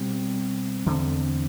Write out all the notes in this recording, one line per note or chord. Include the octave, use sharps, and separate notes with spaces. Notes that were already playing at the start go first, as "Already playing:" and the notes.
Already playing: B2 G3 C4
E2 D3 A3 C4